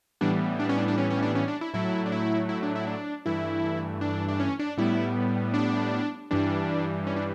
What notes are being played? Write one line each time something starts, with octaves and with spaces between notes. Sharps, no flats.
A2 E3 G3 B3 D4
D4
C#4
D4
D4
C#4
C#4
D4
C#4
D4
E4
A2 F#3 A3 E4
D4
E4
E4
D4
E4
D4
G2 E3 A3 E4
D4
D4
C#4
D4
A2 G3 B3 E4
D4
G2 E3 G3 D4
C#4
D4